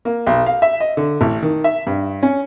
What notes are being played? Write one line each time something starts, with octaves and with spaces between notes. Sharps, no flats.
A#3
B1
F5
E5
D#5
D3
A1
D#3
E5
G2
C#4